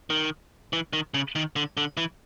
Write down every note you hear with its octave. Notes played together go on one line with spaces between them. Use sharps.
D#3
E3
D#3
C#3
D#3
D3
D3
E3